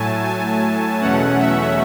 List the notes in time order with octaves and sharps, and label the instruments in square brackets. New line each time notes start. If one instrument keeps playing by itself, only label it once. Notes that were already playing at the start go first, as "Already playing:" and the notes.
Already playing: [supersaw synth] A2 F#3 A3 G#5 A5
G#5
E2 B2 F#3 A3 C#4 F#5
E5